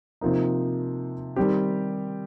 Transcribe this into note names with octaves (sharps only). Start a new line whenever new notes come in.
C3 F3 A#3 D#4
D#3 G3 C4 G4